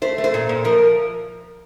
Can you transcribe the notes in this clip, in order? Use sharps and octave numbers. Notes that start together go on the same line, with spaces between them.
A3 C5
A3
C5
A#2
A#2
F3 A#4